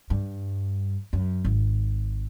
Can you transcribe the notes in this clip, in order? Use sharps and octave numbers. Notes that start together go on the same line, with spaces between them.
G2
F#2
G#1